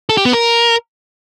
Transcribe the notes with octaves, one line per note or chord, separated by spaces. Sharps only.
A4
G4
B3
A#4